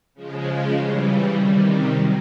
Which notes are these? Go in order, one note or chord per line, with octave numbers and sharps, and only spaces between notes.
C#3 F3 G#3
C#3 E3 G3
C3 D#3 G3
F#3